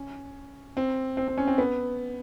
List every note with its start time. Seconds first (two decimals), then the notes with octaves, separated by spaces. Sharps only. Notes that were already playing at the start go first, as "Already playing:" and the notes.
Already playing: C#4
0.77 C4
1.17 C4
1.28 C4
1.38 C#4
1.47 C4
1.58 B3